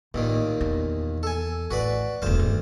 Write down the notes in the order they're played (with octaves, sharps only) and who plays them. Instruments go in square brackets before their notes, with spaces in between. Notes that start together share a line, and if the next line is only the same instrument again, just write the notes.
[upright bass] A1 [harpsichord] D#2 A#2 D#3
[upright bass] E2
[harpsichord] A4 G#5
[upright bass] A1 [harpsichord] F#4 B4 D5
[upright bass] E1 G2 [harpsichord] D2 C5 F5
[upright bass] D#2